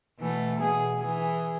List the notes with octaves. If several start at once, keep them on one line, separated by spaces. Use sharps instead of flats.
B2 E3 A3
B2 G#4
E3 G#4